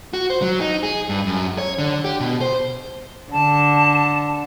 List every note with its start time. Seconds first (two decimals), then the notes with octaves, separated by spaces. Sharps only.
0.13 F#4
0.30 C5
0.42 F#3
0.61 D#4
0.83 G#4
1.09 G2
1.26 F#2
1.58 C#5
1.78 D3
2.04 G4
2.20 B2
2.41 C5
3.32 D3 A5